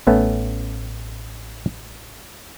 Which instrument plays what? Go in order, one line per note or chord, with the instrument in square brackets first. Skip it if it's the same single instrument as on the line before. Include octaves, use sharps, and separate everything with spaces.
[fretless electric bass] A1 [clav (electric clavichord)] A3 B3 C#4